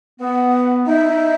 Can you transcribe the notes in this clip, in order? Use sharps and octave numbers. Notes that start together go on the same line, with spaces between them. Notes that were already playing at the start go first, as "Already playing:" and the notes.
B3 F#5
D#4 E5
D#4